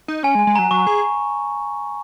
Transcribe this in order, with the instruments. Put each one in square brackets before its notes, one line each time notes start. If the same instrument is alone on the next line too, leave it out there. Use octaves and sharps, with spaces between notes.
[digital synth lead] D#4
[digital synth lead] C#4 [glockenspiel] G#5
[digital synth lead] G#3
[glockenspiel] G#5
[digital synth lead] G#3
[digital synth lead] F#3 [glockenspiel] A#5
[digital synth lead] F#3 [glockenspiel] C#6
[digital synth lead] G#4